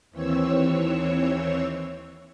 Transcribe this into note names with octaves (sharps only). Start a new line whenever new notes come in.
D#2 E3 C4 C#5 E6